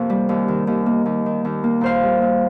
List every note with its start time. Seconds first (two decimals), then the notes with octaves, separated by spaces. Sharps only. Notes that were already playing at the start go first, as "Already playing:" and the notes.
Already playing: F2 C3 A#3
0.10 G3
0.29 D#2
0.48 D#3
0.67 D#2
0.86 A#3
1.06 D#2
1.26 D#3
1.45 D#2
1.64 A#3
1.81 A#2 C5 F5
2.03 G3
2.22 A#2